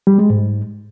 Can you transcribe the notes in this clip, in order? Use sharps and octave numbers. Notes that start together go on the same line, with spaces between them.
G3
G#3
G#2